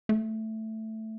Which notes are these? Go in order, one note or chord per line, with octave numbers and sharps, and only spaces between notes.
A3